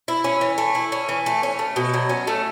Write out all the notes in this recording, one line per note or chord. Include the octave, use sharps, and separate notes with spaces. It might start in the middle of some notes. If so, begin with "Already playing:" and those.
E4
C#4
E3
A3
E4
C#4
E3
A3
C#4
A3
B2
F#3
C#4
A3